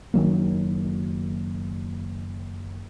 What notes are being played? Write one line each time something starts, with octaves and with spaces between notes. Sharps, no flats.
F#1 D#3 F#3 A#3